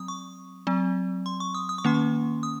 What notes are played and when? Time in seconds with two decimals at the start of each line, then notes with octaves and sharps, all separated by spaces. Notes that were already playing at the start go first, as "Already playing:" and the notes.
Already playing: F#3 C4 D#6
0.08 C#6
0.67 F#3 C4
1.26 C6
1.40 C#6
1.55 D#6
1.69 D#6
1.78 C#6
1.84 D#3 A#3 C#4 C6
1.94 C#6
2.43 D#6